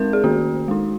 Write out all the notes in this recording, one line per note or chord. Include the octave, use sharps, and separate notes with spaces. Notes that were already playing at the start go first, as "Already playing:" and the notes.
Already playing: G#3 C4 D#4 A#4
G#4
D#3 A#3 C#4 F#4
G#3 D#4